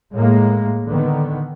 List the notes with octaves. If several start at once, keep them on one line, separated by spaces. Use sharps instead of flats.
A2 G#3 A#3
D3 D#3 B3